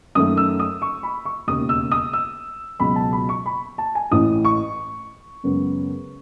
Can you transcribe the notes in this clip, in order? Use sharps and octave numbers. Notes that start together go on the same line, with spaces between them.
F#2 D#3 A3 D#6
E6
D#6
C#6
B5
C#6
E1 D#2 C#3 D#6
E6
D#6
E6
C#2 B2 F#3 B5
A5
B5
C#6
B5
A5
G#5
A1 A2 E3 D#6
C#6
F#2 C#3 G#3 B3